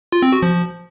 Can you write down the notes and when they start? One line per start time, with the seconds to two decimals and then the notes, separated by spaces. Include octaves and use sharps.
0.12 F4
0.22 C4
0.32 F#4
0.42 F3